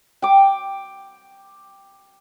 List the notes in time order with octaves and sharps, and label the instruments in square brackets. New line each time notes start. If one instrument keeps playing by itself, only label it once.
[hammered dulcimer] G5 D6